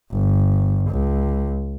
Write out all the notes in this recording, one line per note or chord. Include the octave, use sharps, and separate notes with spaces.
G1
C#2